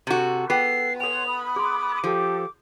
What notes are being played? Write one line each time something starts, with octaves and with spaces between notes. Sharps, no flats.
C3 F#4 A4
B3 F4 G#4 A4 G5 C7
A4 C#5 G#5 C6 F7
B5 D#6
G#4 C6 D6
F3 G4 A4